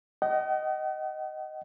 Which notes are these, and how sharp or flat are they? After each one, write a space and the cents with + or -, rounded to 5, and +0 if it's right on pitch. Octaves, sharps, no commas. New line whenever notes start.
D#5 +0 F#5 +45